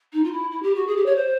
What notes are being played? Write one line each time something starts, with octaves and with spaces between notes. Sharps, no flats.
D#4
F4
E4
E4
G4
F#4
G#4
G4
C#5
C5